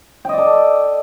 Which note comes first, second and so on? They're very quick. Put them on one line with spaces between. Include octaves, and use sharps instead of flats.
G5 D#5 D5 A4